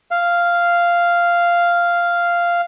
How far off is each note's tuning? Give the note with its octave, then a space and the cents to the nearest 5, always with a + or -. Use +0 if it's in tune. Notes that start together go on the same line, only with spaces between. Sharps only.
F5 -5